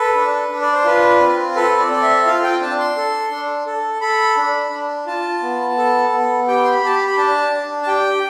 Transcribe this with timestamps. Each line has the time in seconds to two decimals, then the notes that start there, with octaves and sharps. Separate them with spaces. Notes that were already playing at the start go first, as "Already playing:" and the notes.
Already playing: A4 B4
0.15 D4
0.51 D4
0.61 D5
0.73 C5
0.85 F4 B4
1.20 C4
1.56 A4 B4
1.80 D5
1.90 C4 D5
2.02 E5
2.26 F4 F5
2.44 G5
2.61 D4 A5
2.79 C6
2.97 A4
3.31 D4
3.66 A4
4.01 A4 B5
4.37 D4
4.71 D4
5.06 F4 A5
5.42 B3
5.78 A4
6.12 B3
6.48 G4 G5
6.64 C6
6.71 B5
6.83 G4 A5
6.94 B5
7.07 B5
7.17 D4 A5
7.52 D4
7.83 A5
7.87 G4 G5